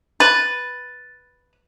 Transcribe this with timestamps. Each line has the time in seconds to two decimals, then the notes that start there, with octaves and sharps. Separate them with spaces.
0.20 B4 A6